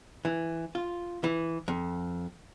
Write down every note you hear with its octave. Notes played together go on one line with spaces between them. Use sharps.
E3
F4
E3
F2